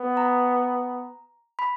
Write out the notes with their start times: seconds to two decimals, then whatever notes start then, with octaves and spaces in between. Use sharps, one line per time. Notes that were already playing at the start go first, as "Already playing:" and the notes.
Already playing: B3
0.17 A#5
1.59 B5